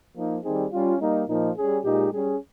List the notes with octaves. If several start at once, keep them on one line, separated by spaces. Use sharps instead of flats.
F3 A#3 D#4
D#3 G3 C4 D#4 G#4
G3 C#4 F4
G3 A#3 D#4
A#2 F3 A#3 D#4
G3 C#4 G#4
A#2 G#3 D#4 G4
G3 C#4 G#4